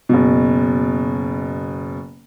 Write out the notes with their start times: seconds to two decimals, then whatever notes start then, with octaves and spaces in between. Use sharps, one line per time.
0.09 F#1 B2